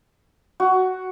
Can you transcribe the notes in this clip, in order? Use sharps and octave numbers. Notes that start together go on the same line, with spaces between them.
F#4